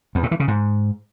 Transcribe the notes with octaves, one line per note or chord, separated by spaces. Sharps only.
E2
A2
E3
C#3
G#2